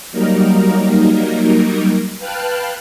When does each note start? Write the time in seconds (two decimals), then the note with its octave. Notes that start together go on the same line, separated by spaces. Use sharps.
0.12 F#3 G3 A#3 D#4 A#4
2.19 B4 F5 G5 A5 F6 F#6